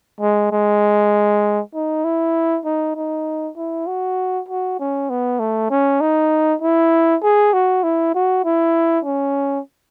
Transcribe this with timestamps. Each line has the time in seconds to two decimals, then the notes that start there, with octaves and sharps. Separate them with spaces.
0.21 G#3
0.52 G#3
1.75 D#4
2.05 E4
2.65 D#4
2.96 D#4
3.57 E4
3.87 F#4
4.48 F#4
4.79 C#4
5.10 B3
5.40 A3
5.71 C#4
6.01 D#4
6.62 E4
7.23 G#4
7.53 F#4
7.84 E4
8.15 F#4
8.45 E4
9.05 C#4